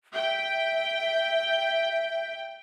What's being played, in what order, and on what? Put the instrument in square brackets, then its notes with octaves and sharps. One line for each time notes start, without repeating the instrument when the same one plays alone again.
[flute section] E5 [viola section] G5